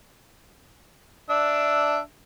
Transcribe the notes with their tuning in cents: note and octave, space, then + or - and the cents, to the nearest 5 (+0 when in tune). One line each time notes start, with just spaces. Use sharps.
D4 +0 E5 +0